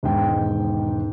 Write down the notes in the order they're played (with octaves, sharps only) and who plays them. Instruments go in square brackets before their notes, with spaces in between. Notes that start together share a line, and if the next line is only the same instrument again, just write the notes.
[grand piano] E1 G#2 D#3 G5